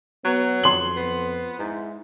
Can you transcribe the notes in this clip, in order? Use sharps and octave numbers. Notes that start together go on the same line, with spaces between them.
F#3 B3
F2 C6 F#7
B3
G#2 E4